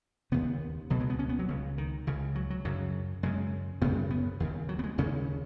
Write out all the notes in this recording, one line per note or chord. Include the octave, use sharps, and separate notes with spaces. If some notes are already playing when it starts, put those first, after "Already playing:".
D#2 C#3 B3
C#2 B2 F#3
G#3
B3
C#4
B3
F#3
C#2 C#3
D#3
C#2 C#3
F#3
F#3
F#2 C#3 F#3
F#2 C#3 G#3
F#2 C#3 B3
B3
D#2 C#3
F#3
B3
G#3
D#2 C#3 C#4